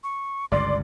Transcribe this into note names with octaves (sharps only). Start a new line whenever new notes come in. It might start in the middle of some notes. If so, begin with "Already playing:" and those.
C#6
G1 C#2 G2 D5 C6